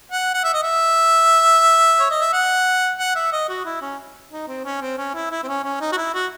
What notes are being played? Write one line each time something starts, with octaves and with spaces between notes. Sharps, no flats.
F#5
F#5
E5
D#5
E5
C#5
D#5
E5
F#5
F#5
E5
D#5
F#4
E4
C#4
D#4
C4
C#4
C4
C#4
E4
E4
C4
C#4
C#4
D#4
F#4
E4
F#4